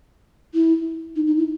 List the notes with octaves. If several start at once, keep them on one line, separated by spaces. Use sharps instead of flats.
E4
D#4
D#4
E4